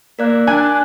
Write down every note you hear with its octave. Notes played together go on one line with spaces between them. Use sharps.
A#3 A#4 D5 F#6
D4 G#5 F#6